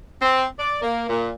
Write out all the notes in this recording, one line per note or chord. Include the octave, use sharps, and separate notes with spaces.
C4
D5
A#3
A#2